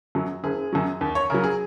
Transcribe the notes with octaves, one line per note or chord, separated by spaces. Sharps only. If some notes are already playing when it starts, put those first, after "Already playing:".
F#2 F#3
F#1 G#4
F#2 F#3
D#2
C#5
C#3 F#3 A#4
G#4